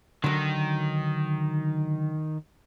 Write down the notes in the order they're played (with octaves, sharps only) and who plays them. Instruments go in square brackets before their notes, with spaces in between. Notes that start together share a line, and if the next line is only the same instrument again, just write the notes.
[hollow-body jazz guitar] D3 F#3 [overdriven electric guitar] D#3